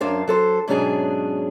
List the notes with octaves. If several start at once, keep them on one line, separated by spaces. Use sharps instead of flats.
F#2 F#3 D4 C5 F5
F#3 A4 C5
G#2 B2 F#3 C#4 D4 G#4